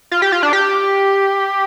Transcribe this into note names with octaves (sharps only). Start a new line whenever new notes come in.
F4
G4
F4
D4
G4